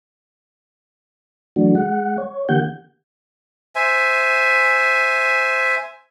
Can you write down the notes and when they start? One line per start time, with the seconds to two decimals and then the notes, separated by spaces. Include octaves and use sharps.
1.56 E3 F#3 A3 D4 F#4
1.75 G#3 F#5
2.18 C#5
2.49 D3 E3 A#3 G4 F#5 G6
3.75 C5 E5 G#5